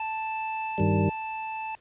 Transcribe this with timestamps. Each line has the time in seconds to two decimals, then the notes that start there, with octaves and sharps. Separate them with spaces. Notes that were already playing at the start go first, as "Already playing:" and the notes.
Already playing: A5
0.78 G2 D#3 G3